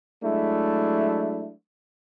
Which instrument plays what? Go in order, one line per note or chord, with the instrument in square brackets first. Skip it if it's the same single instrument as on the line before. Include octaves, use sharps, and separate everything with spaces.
[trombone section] F#3 G#3 A3 D4 E4